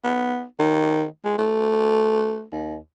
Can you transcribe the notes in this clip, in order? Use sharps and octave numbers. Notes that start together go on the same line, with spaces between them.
B3
D#3
G#3
A3
D#2